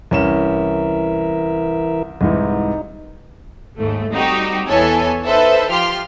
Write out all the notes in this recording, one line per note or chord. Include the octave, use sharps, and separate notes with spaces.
C2 E3 C#4 A#4 E5 E7
C2 G#2 E3 D#4
D#2 G#2 A3
G3 C4 D#4 F#4 G4
E2 E3 B3 A4 C#5 G#5
D#4 A4 B4 C5 E5
F3 F4 G4 C6 F6